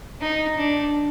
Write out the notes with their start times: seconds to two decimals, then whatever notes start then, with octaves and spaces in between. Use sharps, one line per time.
0.21 D#4
0.57 D4